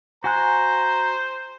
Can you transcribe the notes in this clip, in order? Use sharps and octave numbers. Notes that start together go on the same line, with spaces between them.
F#4 C5 G#5 A#5 F#6